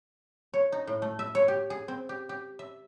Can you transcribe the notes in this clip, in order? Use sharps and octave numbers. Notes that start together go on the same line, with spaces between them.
C#5
D#4
A2
A3
E5
C#5
G4
G#4
C4
G4
G4
E5